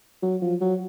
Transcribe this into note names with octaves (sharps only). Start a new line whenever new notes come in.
F#3
F3
F#3